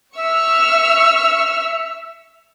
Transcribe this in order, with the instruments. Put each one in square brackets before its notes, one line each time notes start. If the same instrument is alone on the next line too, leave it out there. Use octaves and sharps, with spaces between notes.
[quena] E5 [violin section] C#6 E6 F6